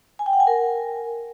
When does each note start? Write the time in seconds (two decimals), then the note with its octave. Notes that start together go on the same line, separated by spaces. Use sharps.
0.19 G#5
0.26 G5
0.33 F#5
0.40 G#5
0.47 A#4